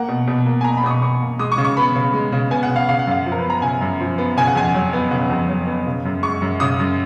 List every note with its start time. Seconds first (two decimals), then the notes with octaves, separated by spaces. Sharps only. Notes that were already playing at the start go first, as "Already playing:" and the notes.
Already playing: A#3 F#5
0.08 B2
0.28 B2
0.46 A#3
0.61 G#5
0.64 A#3 A#5
0.77 B5
0.83 B2 D#6
0.90 C#6
1.02 B2 C#6
1.21 A#3
1.39 G#3 D#6
1.52 C#6
1.58 C#3
1.65 C#6
1.77 B3 B5
1.95 C#3
2.14 G#3
2.32 C#3
2.51 B3 G#5
2.63 F#5
2.70 C#3
2.76 F5
2.89 C#3 F5
2.99 F#5
3.07 F#2 F5
3.26 F3
3.32 A#4
3.38 B4
3.44 B3
3.50 A#5
3.62 C#3 G#5
3.81 F#2
4.00 F3
4.18 B3
4.37 C#3 G#5
4.47 F#5
4.55 F2 G#5
4.75 F#3
4.93 B3
5.11 C#3 F#5
5.29 F2
5.49 F#3
5.67 B3
5.86 C#3
6.05 F#2
6.23 G#3 C#6
6.42 F#2
6.60 C#3 D#6
6.80 F#2